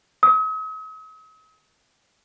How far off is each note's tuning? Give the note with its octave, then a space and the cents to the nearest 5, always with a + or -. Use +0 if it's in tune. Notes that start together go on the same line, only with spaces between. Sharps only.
D#6 +45